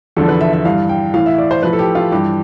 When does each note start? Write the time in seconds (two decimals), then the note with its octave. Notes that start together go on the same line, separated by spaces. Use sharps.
0.17 E2 D3 F3 A4
0.28 B4
0.41 E5
0.53 E5
0.65 G2 E3 F5
0.89 G5
1.14 A2 E3 F5
1.26 E5
1.38 D5
1.51 C5
1.63 A2 F3 B4
1.73 A4
1.79 G4
1.95 F4
2.12 G2 E3 G4